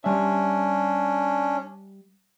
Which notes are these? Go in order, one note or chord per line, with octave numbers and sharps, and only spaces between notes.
G3 C#4 D4 E5